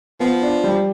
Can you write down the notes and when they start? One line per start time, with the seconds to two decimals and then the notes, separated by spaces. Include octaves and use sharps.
0.20 F3 B3
0.42 D4
0.64 G3